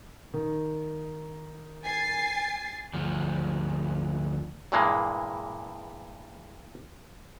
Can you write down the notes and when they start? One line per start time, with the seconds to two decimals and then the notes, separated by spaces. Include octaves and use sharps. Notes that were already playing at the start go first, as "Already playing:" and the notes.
0.34 D#3
1.84 G#5 A6 C7
2.95 D2 F3
4.72 E2 G2 A#2 E3 G#3 A#3